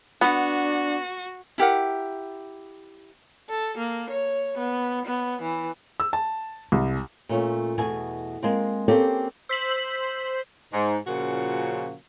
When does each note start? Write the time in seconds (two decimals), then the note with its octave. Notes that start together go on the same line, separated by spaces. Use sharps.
0.21 B3 D4 F#4
1.58 E4 G4 A#4 F#5
3.50 A4
3.78 A#3
4.10 C#5
4.58 B3
5.06 B3
5.42 E3
6.00 E6
6.13 A5
6.72 C2
7.29 A#2 A3 C#4
7.78 E2 B2 A3 G#5
8.43 G#3 A#3 C4
8.88 A#3 C4 C#4 G4 A4 G5
9.49 C5 E6 B6 F#7
10.73 G#2
11.07 A#2 C#3 F3 A#3 C#4 F#4